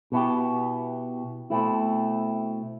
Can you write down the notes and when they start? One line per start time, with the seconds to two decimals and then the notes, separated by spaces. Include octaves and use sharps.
0.12 B2 B3 E4 G4
1.50 B2 A3 C4 E4